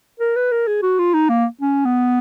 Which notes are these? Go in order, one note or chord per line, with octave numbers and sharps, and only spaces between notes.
A#4
B4
A#4
G#4
F#4
F4
D#4
A#3
C#4
B3